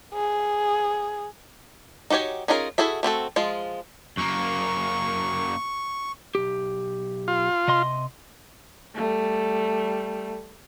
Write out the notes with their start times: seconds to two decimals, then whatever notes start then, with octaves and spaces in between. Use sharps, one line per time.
0.14 G#4
2.10 D#4 F#4 G4 C#5 G#5
2.48 C#4 D#4 F4 G#4 A#4
2.78 E4 F#4 G#4 A4 E5
3.03 A3 C4 F#4 A4
3.36 F3 G#3 F4
4.17 F#2 A#3 C#6
6.35 B1 G4
7.28 F4
7.68 C3 D#5 C6
8.94 G3 A3